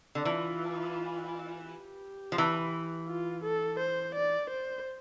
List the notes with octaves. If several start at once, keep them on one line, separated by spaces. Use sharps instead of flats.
D3
E3 F4
G4
F3
E3
F4
A4
C5
D5
C5